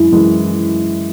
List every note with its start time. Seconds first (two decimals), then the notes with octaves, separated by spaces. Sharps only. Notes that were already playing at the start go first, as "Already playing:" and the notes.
Already playing: F#2 E3 G#3 E4
0.12 F#2 E3 G#3